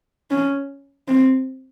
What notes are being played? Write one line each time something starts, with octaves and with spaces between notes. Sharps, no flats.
C#4
C4